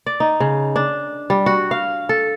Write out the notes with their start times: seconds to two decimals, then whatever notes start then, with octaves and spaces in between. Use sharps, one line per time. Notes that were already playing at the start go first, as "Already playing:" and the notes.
0.06 D5
0.20 D#4
0.40 C#3
0.76 D4
1.30 G3
1.46 F#4
1.71 F5
2.09 A4